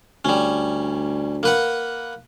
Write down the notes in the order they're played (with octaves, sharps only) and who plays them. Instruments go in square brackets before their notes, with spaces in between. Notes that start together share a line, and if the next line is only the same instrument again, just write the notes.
[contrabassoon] D2 [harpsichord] G3 C#4
[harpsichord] A#3 B4 F#5